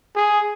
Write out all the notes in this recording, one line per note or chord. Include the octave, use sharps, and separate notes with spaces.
G#4